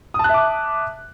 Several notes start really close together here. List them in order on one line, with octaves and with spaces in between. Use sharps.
D#6 A5 F#6 E5 D6